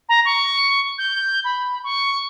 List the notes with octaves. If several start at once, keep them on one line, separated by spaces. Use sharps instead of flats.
A#5
C#6
G6
B5
C#6